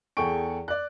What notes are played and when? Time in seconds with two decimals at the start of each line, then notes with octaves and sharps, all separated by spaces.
0.17 E2 G#4 A4 G5 C#6 D7
0.68 D5 F#6